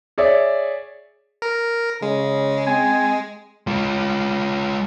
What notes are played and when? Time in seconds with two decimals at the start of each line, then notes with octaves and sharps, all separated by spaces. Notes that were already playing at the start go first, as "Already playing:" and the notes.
0.18 G#4 C#5 D5 E5
1.42 A#4
2.02 C#3 G#3
2.66 C4 G#5
3.67 G#3 F4